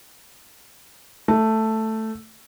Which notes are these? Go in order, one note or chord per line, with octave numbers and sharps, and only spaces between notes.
A3